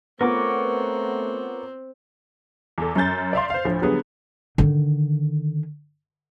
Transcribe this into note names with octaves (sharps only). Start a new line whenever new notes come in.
A3 B3 C4 F4 A#4 C#5 D6
E2 A4
F#2 C#4 G#5 G6 A6
D5 E5 F5 C6
C5 F5
D2 A2 F3
D3 F#3 G3 B3 G#4
D3 D#3